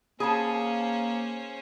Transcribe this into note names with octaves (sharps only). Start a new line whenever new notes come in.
A#3 C#4 G#4 C5 A5